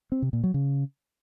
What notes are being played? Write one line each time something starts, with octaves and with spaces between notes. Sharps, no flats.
C4
C3
A#2
F#3
C#3